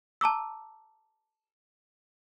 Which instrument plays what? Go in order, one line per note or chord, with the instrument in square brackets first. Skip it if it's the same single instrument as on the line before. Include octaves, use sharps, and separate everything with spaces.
[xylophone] A5 A#5 D6 E6